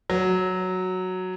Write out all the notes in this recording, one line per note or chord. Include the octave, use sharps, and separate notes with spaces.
F#3